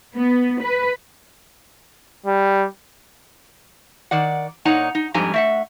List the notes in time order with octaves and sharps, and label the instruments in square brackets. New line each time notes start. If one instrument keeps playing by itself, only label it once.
[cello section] B3
B4
[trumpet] G3
[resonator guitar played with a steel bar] D#3 D5 F#5
A#2 D#4 C#5 F#5 A#5
D#4
F2 G#2 G3 D4 G#5 A#5
A3 E5 F#5